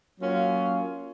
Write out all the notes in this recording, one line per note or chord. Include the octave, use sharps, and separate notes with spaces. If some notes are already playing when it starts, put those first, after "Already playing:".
F#3 A#3 C#4 F4